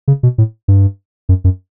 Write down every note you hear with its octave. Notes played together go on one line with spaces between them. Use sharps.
C#3
B2
A2
G2
F#2
F#2